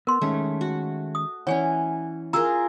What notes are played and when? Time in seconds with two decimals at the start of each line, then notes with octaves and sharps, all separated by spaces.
0.07 B3 A#4 C6
0.22 D#3 G#3 A3 C#4
0.61 F#4
1.15 D#6
1.47 E3 C#4 C#5 D5 F#5 G#5
2.33 F4 G#4 A#4 A#5 E6